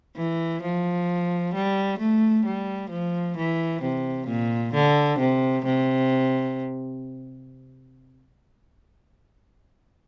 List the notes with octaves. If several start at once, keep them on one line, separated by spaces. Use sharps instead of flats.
E3
F3
G3
A3
G3
F3
E3
C3
A#2
D3
C3
C3